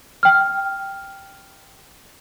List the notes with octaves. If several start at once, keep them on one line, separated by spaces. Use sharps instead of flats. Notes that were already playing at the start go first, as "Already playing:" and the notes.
G5 F6